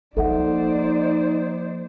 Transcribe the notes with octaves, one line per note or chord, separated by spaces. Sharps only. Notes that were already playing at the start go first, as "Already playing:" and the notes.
F3 A#3 D#4 A4 C5 D5 E5 F#5